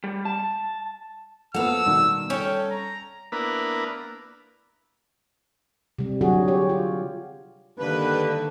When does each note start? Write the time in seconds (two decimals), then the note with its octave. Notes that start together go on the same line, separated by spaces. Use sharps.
0.04 G3
0.25 A5
1.54 F3 A#3 B3 A4 F5 F#5 E6
1.86 B2 D#3 G3
2.30 C#4 A4 C#5 G5
2.71 A#5
3.32 A#3 B3 D4 E4 A#4 B4
5.99 C3 G3
6.21 D3 F#3 F#4 G#4
6.48 G4 C#5
6.69 F4
7.79 G2 D3 D#3 A#3 B4